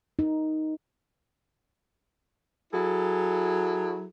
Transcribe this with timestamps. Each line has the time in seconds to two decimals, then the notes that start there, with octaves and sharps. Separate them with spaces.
0.19 D#4
2.73 F#3 E4 G#4 A4